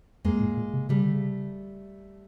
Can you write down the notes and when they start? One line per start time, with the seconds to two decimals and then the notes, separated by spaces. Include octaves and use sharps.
0.25 F2 G#3 A#3
0.40 A2
0.57 A#2
0.73 C3
0.89 C#3 G3 A3
1.02 D3
1.14 C#3